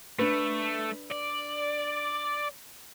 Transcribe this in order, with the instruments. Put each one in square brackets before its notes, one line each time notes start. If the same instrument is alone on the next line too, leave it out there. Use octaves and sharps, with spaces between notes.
[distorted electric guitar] A3 [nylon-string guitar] D4 B4
[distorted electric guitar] D5